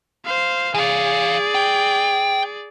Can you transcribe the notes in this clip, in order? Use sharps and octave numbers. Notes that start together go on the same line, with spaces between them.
C5 F5
E3 G#4 D5 F5
G5